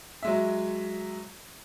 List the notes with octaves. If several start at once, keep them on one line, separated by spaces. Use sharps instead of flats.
F#3 G#3 E5